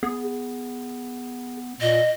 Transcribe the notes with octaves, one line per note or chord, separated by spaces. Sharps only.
B3 G#4
A#2 D#5